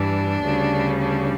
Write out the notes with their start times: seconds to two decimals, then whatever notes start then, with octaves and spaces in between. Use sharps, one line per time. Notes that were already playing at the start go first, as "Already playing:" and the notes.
Already playing: G2 E3 G3 D4
0.43 D2 C#3 G3
1.01 D4